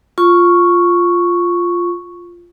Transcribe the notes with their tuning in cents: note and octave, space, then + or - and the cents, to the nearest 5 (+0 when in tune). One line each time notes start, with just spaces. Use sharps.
F4 +0 C#6 +0